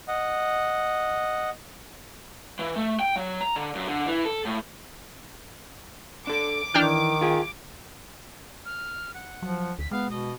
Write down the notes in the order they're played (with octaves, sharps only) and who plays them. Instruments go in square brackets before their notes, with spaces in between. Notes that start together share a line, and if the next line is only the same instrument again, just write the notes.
[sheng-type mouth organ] D#5 F#5
[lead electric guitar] E3
A3
G5
F#3
A#5
D3
F#2
D3
E3
A4
A2
[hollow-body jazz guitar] D4 A4 [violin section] D6
[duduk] D#3 [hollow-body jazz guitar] E3 [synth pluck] D4 G5 F6
[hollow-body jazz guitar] F4 G#4
[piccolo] F6
F#5
[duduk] F3 [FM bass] F#3
[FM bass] D2 [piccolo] B6
[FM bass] G#3 [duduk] B3 [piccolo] F5
[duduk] B2 [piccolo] D#5